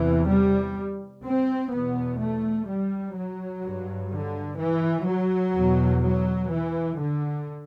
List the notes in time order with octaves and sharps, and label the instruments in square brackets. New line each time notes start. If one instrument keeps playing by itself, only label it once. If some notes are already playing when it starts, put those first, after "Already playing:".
Already playing: [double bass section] E2 C3 E3
G3
C4
E2 B2 B3
A3
G3
F#3
G2
D3
E3
F#3
E2 B2
F#3
E3
D3